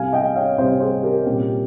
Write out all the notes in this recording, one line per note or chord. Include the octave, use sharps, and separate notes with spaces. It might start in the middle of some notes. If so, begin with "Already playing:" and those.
Already playing: C2 C3 G3 F5 G#5
D#5 G5
C#5 F5
C2 C3 G3 C5 D#5
G#4 C5
G4 A#4
C2 A#2 G3 C#4 G4